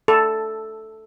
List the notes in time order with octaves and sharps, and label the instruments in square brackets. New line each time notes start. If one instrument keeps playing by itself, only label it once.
[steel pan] A4